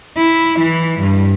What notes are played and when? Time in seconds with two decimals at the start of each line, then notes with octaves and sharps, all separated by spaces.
0.17 E4
0.60 E3
1.00 G2